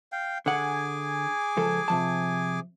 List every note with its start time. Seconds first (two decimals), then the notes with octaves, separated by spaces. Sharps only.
0.12 F5 G5
0.46 D3 G#4 F#5 G#5 D6
1.57 C#2 F3 A4
1.88 C3 F3 A5